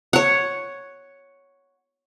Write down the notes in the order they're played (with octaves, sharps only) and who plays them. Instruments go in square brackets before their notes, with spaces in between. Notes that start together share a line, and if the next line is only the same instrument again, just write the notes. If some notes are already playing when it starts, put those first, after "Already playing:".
[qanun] C#5 F#5